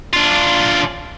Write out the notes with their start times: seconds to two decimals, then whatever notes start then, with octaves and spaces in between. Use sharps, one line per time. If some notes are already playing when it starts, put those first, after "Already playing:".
0.14 D4 F4